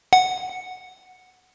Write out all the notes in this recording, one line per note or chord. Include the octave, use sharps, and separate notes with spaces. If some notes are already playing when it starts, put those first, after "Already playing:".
F#5